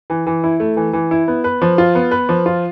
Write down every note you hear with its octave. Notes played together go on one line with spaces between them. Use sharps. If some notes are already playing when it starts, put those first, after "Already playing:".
E3
E3
E4
A3
E3
E3
E4
B3
B4
F3
F4
B3
B4
F3
F4